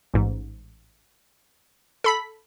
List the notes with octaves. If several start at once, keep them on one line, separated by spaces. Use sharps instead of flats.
A1 G#2
A4 B5 B6